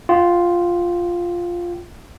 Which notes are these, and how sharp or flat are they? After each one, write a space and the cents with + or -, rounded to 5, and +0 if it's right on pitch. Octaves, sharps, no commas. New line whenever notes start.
F4 +0 G5 -35